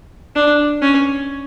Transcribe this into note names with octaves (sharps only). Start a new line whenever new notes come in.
D4
C#4